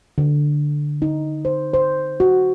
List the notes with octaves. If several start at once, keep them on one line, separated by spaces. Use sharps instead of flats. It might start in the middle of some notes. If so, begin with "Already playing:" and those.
D3
D#4
C5
C5
F#4